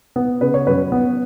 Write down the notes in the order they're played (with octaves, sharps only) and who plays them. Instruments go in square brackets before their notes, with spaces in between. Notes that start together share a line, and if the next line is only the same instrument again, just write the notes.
[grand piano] B3
C#3 B4
C#5
F#2 B4
B3